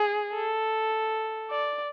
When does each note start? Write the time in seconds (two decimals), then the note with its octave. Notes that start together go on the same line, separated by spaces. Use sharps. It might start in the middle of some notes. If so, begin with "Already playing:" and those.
Already playing: G#4
0.34 A4
1.51 D5